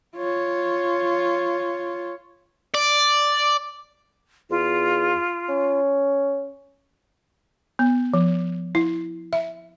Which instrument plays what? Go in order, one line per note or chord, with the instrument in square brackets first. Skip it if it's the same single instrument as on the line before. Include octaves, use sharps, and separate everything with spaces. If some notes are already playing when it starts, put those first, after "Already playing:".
[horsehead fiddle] F4 C#5
[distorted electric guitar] D5
[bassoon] E2 [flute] F4
[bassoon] C#4
[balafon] B3
F3
E4
E5